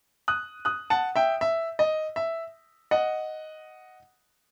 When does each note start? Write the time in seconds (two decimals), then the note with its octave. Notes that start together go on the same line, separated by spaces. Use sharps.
0.28 D#6 F#6
0.65 D#6 F#6
0.90 F#5 A5
1.16 E5 G5
1.41 E5
1.79 D#5
2.16 E5
2.91 D#5 F#5